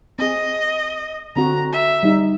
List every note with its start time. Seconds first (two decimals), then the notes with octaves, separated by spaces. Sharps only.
0.19 C4 G#4 D#5
1.36 D3 C4 F#4 A#5
1.72 E5
2.03 G3 D#4